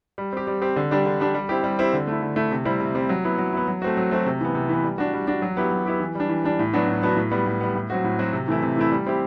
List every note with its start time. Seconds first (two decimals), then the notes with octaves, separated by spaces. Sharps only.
0.18 G3
0.33 C4 G4
0.47 G3
0.62 C4 G4
0.76 D3
0.91 G3 D4 G4
1.06 D3
1.20 G3 D4 G4
1.34 G3
1.49 C4 E4 G4
1.64 G3
1.79 C4 E4 G4
1.93 D3
2.07 A3 E4
2.22 D3
2.36 A3 E4
2.51 C3
2.65 G3 C4 E4
2.81 C3
2.95 G3 C4 E4
3.09 F#3
3.24 B3 E4
3.38 F#3
3.53 B3 E4
3.68 F#3
3.82 A3 C4 F#4
3.97 F#3
4.11 A3 C4 F#4
4.26 C3
4.40 E3 B3
4.55 C3
4.69 E3 B3
4.84 G3
4.98 D4 F#4
5.13 G3
5.27 D4 F#4
5.42 F#3
5.57 B3 E4 G4
5.71 F#3
5.86 B3 E4 G4
6.00 E3
6.15 G3 D4
6.29 E3
6.44 G3 D4
6.59 A2
6.73 F#3 B3 D4 F#4
6.88 A2
7.02 F#3 B3 D4 F#4
7.17 A2
7.32 G3 B3
7.46 A2
7.61 G3 B3
7.75 A2
7.90 F#3 C4 F#4
8.04 A2
8.19 F#3 C4 F#4
8.33 C3
8.48 E3 A3 E4
8.62 C3
8.77 E3 A3 E4
8.92 G3
9.07 C4 E4 G4